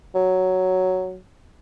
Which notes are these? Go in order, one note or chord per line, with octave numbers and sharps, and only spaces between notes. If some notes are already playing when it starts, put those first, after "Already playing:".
F#3